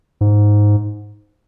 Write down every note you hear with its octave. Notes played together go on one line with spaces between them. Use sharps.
G#2